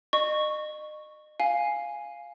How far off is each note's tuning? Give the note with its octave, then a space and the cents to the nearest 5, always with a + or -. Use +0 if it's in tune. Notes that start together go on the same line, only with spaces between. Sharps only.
D#5 -35 C#6 +0
F5 +0 G#5 +0